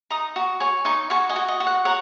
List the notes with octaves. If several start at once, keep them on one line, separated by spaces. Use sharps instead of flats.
D#4 A#5 D#6
F#4
C#5 G#5 C#6
D#4 G#5 C#6
F#4 G#5 C#6
D#5 G#5
F#4
D#5
F#4
F#5
C#5 F#5 A#5